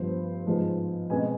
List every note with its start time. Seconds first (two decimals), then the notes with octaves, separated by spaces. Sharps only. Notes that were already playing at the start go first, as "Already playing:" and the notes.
Already playing: G2 F3 B3 C5
0.46 G#2 F3 G#3 B3
1.10 B2 G#3 C4 G#4 G#5